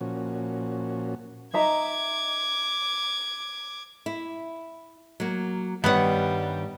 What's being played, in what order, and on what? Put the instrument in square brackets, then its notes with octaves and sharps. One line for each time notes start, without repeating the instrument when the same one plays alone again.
[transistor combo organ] A#2 F3 C#4 F#4
[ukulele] D#4 E5 A#5 [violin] D6 G#6
[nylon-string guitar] E4
F#3 A#3
[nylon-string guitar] G2 D#3 C#5 [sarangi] G3 [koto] B3 F#5